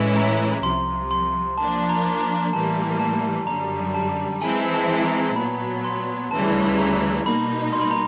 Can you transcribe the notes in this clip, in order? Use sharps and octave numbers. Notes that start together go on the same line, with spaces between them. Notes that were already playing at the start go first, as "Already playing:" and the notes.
Already playing: A2 E3 G#3 C#4 E4
A#5
C2 C3 F3 C6
C6
F3 A#3 D4 A5
A#5
A#5
A2 E3 G3 A#3 A5
A5
F#2 D3 G3 A#5
A5
E3 G#3 C4 E4 G#5
A5
A#5
A#2 F#3 B3 B5
C6
D2 C#3 E3 G3 A5
A#5
B2 G3 A#3 D#4 B5
C6
B5
A#5